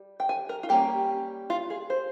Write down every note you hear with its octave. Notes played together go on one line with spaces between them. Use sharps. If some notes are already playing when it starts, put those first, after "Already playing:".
Already playing: G3
G5
G#5
A#4
F4
G3 A#3 C#4 G4
F4
G#4
C5